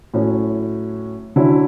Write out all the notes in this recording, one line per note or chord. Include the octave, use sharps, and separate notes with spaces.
A2 F#3 C#4
D3 F#3 C#4 E4